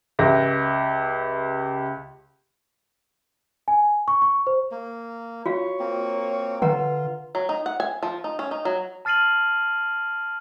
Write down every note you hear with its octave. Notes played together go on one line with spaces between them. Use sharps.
C#2 G4 E5 A#6
G#5
C#6
C#6
C5
A#3
F4 F#4 C#5 F5
A#3 C4
D3 F4 B4 F#5 A#5
F#3
D#4
F#5
G#5
F3
D#4
C#4
D#4
F#3
A5 F6 A6 C7 D#7 F#7